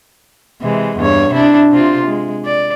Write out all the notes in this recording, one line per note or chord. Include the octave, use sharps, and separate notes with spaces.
C3 E3 G#3
E2 G2 C#5
C3 D4 E4
C3 C4 F4
G#3
D5